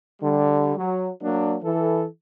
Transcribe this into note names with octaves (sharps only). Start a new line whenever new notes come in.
D3 G3
F#3
F#3 A#3 D4
E3 A4